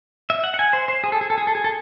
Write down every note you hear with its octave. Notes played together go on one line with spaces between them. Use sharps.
E5
F#5
F#5
G#5
C5
C5
G#4
A4
G#4
A4
G#4
A4
G#4
A4